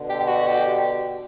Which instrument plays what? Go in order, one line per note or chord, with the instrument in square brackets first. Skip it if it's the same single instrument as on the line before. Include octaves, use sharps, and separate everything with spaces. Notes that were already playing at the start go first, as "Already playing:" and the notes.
Already playing: [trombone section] B2 D3
[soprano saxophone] G4
G4
F#4
G4